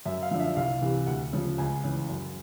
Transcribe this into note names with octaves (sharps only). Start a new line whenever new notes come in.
F#2 E5
F5
D3 F3
E5
C2 F5
C3 E3
D2 F#5
C#3 F3
C#2 G#5
C#3 E3
F#2